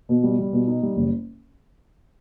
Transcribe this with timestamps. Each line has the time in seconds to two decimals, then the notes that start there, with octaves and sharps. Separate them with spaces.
0.09 B2
0.23 G3
0.38 G3
0.53 B2
0.68 D#4
0.82 G3
0.96 F#1